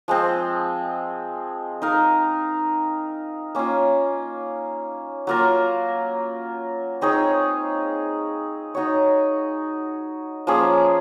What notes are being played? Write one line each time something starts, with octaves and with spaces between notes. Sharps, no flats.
F3 G#3 C4
D#4 A#4 F5
A#3 C#4 F4
F#3 A#3 F4 A#4
C4 D#4 G#4 C#5
D#4 F#4 C#5
F3 A#3 C#4 G#4